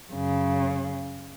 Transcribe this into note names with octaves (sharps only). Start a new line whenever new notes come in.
F#2 C#3